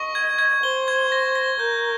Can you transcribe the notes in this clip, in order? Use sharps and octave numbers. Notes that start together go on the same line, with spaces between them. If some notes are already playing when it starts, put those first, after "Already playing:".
Already playing: D#5 C#6
G#6
G#6
C5 G7
G#6
A#6
A#6
A#4 G6